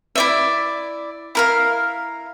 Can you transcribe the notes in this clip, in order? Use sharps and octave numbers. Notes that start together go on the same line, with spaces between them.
E4 D5 E5
E4 A#4 F5